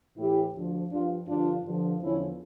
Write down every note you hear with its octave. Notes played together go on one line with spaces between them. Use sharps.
A2 E3 E4 G4
D2 D3 F3
G2 F3 D4 F4
G2 D3 F3 D4 F4
G2 D3 F3
E2 D3 F3 C#4 E4